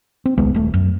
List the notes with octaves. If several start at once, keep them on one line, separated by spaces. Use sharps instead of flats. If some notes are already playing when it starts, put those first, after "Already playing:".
C4
D1 C2 G#3 B3
D#1 A3
F#2